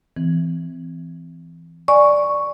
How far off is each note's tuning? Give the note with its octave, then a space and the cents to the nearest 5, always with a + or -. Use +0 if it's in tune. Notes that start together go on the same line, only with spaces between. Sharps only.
E3 +10 C4 -25
D5 +0 G#5 +0 C#6 +0